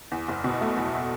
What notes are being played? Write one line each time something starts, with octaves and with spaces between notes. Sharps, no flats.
E2
F#1
B2
A3
E2